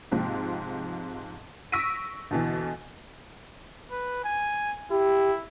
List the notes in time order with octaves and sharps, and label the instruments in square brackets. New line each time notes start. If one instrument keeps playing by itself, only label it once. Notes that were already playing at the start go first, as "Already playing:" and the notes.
[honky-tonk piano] G#2 C3 F3 C4
C#6 E6 A#6 B6 D7 D#7
D2 B2 E3
[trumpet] B4
G#5
[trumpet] E4 [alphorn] G4